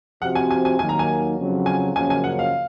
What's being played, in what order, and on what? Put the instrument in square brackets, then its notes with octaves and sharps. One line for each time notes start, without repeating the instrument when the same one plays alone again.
[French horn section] C3 F3 C4 F#4 [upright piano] F#5
[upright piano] G#5
G#5
G#5
[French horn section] D#2 D#3 F#3 A#3 [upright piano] G#5
[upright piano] A#5
G#5
[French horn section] F2 C#3 F#3
[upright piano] G#5
[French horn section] F#2 C#3 F3 A#3 [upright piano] G#5
[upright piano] G#5
F#5
F5